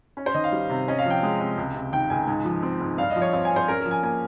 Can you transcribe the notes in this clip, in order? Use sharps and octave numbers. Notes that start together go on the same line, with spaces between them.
C#4
C5
D#3 D#5
F5
G3
C3
C#4 D#5
F5
F3
G5
G#3
C3
C#2
C3
D#3 G5
C#2 G#5
G#2 G#5
F3
C4
G#2
G2 F5
D#5
F3
C#5
C4 F5
G#5
G2
C5
C#4 A#4
F3 A#4
G#5
A#3 G#5